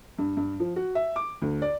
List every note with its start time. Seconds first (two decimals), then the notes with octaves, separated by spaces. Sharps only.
0.19 G2
0.37 G2
0.60 F3
0.76 F#4
0.95 E5
1.16 D6
1.42 D2
1.62 D5